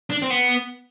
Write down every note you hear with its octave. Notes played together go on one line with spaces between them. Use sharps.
D4
C4
B3